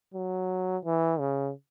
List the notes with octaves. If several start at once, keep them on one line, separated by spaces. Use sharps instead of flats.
F#3
E3
C#3